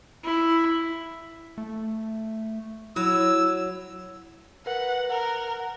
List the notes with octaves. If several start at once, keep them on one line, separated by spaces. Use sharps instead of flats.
E4
A3
F#3 E4 E6
A#4 B4 F#5
A#4 F#5